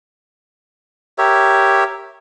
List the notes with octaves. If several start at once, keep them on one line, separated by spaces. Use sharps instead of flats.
G4 A#4 C#5 E5